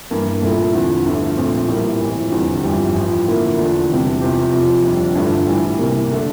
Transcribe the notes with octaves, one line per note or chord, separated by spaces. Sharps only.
G2 E3 A#3
C2 A#2 A3 E4 A4
E2 D3 F3 C4
G1 G2 F3 A3
A#1 A#2 A3 C4 F4
A1 A2 G3 A#3
F1 F2 E3
F1 E2 D3 G3 C4
G1 F2 E3 G3 C4
A1 A2 F3
F2 D3 F3 A#3 E4
E2 D3 F3 A3 D4
E1 E2 C3 G3 C4
E2 C3 F3 C4 G4
F2 C3 F3
F1 F2 D3 G3 D4
A1 G2 D3 F3 A3
A2 E3 G3
C2 C3 G3 A#3
D3 A3 D4